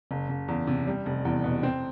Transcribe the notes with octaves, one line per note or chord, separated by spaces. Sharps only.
F#1
F#1
E2
C3
G3
F1
E2
B2
C4